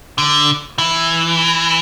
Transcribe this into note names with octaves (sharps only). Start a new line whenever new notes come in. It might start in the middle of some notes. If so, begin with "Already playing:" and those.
D3
E3